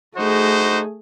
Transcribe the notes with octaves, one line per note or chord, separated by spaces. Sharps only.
A3 D#4 F#4 G#4 C5